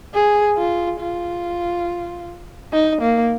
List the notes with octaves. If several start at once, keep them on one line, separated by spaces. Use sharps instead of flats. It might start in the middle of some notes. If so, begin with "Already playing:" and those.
G#4
F4
F4
D#4
A#3